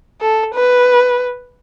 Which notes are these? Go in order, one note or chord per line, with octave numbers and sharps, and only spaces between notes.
A4
B4